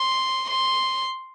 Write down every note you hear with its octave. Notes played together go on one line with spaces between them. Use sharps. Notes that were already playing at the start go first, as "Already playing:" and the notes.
Already playing: C6
C6